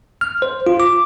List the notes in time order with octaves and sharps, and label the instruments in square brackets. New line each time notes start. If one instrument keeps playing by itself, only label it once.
[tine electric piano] F6
C5
F4
D6